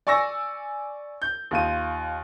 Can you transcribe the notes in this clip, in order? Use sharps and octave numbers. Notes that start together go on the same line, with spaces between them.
D5 G#5 C#6 E6 A#6
G6
D#2 F4 D#7